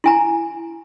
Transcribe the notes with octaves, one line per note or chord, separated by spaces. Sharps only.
E4 G#5 A#5